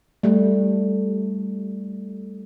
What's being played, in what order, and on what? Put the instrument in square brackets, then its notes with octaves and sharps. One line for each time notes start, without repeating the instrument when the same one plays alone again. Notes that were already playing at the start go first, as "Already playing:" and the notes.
[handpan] G3 A3